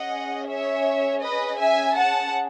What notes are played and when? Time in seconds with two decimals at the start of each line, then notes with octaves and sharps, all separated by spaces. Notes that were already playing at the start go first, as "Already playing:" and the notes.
Already playing: C#4 G#4 D#5 F#5
0.48 C#5 E5
1.22 B4 D#5
1.59 E5 G#5
1.97 F#5 A5